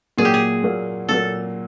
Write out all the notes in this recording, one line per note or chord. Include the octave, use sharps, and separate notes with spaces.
A#2 F#3 A#3 G#4
G4
G#4
A#2 F#3 A#3
A#2 F#3 A#3 A4